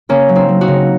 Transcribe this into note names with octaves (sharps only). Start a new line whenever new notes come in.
C#3 A#3 C#4
F#3
C4 D#4
F#3
D#4 F#4
C#3